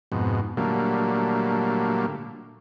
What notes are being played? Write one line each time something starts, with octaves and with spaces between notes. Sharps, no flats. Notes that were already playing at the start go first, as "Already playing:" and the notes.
F2 G#2 B2
A#2 D3 F#3 G3 A3 A#3